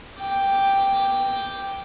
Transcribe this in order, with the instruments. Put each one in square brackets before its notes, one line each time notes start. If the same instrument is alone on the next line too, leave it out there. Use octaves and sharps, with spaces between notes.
[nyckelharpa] G5 D6